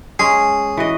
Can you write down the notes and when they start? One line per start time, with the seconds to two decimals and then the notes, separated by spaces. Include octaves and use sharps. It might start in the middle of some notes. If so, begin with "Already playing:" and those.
0.19 G#3 C#4 G#4
0.77 E3 F#4 D#5